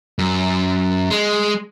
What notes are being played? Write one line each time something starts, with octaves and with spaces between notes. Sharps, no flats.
F#2
G#3